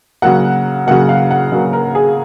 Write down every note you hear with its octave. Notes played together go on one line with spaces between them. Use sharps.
C#3 F#3 A#3 F#5
C#3 F#3 A#3 F#5
F5
F#5
C#3 F#3 A#3
A#4
G#4